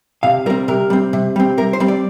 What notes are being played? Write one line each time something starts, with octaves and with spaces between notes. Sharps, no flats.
C3 F5
G3 C4 A#4
C3 A#4
G3 C4
C3
G3 C4
C3 A#4
C5
G3 C4
D5